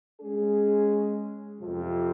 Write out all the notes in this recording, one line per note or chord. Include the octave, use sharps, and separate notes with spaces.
G#3 C#4 G#4
F2 C3 F3